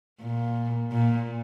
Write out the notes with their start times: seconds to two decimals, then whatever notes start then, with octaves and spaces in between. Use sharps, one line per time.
0.20 A#2
0.91 A#2